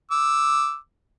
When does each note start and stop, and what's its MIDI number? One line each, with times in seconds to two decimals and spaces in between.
0.11 0.76 86
0.11 0.76 88